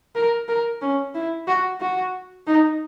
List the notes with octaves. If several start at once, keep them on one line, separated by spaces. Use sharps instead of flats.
A#4
A#4
C#4
E4
F#4
F#4
D#4